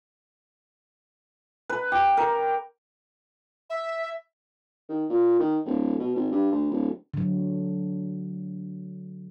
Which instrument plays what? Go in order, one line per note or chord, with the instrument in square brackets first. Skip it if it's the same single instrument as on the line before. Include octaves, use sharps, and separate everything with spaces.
[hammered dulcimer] B4
G4
A#4
[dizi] E5
[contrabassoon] D#3
A#2
D#3
D1
B2
G#1
G2
D2
D1
[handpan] D3 F#3